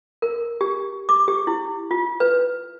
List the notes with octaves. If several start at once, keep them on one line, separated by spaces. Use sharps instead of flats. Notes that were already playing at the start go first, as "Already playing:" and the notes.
A#4
G4
D6
G4
E4
F4
B4